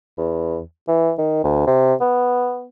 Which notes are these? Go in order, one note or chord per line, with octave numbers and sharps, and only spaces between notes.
E2
E3
D#3
D2
C3
B3